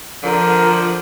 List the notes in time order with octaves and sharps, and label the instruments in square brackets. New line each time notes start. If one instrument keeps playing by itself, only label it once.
[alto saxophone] D3 [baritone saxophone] F3 [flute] A#4